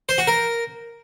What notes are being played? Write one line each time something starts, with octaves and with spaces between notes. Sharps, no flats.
C5
F#4
A#4